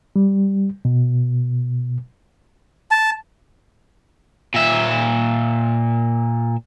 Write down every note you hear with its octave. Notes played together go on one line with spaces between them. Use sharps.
G3
B2
A5
A#2 E5